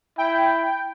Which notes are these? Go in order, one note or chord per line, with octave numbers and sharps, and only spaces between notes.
E4 G5